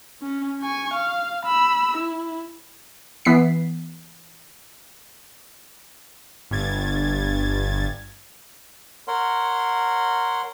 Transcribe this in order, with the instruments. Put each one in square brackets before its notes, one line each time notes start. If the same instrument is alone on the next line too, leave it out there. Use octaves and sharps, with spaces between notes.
[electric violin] C#4
G#5 C#6
F5
B5 E6
E4
[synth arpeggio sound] E3 B3 B6 C7
[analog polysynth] G1 G2 G#6 A6
[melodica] A#4 C#5 F#5 C6